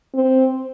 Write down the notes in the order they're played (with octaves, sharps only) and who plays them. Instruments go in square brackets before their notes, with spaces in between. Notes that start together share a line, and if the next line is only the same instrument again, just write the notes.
[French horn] C4